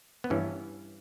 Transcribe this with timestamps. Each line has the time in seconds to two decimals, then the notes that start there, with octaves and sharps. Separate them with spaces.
0.24 B3
0.30 G2 E3 C#4